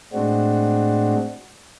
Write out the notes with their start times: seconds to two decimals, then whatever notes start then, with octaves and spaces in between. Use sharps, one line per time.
0.13 A2 G#3 C4 D4 F#4